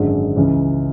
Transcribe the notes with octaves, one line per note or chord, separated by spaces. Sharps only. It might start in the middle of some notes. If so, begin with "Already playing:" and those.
Already playing: G#1 F#2 D3 G#3
C#2 C#3 E3